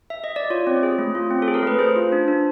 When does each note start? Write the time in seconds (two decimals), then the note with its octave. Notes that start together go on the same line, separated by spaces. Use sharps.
0.10 E5
0.24 D#5
0.36 D5
0.50 F4 C#5
0.67 C4
0.83 G#4
0.99 A3
1.15 F4
1.31 C4
1.42 A4
1.48 G#4
1.54 A#4
1.63 A3 B4
1.79 G#4 C5
1.96 F4
2.12 D4
2.28 D4